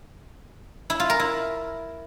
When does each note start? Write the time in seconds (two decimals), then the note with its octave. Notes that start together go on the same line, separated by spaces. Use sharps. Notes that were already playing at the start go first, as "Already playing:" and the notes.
0.90 E4
1.00 F4
1.10 A#4
1.19 E4